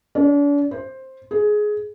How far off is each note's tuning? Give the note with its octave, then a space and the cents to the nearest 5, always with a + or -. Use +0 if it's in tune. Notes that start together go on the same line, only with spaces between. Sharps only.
D4 -40
C5 +10
G#4 +15